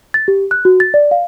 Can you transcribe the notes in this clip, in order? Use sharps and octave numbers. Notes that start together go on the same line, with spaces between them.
A6
G4
F#6
F#4
A6
D5
F5